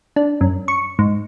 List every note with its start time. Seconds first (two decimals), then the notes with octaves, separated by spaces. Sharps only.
0.16 D4
0.41 F#2
0.68 C#6
0.99 G#2